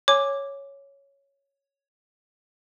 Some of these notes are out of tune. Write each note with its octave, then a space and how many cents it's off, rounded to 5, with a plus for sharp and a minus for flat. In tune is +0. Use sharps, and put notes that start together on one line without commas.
C#5 +0 G#5 +0 D6 +0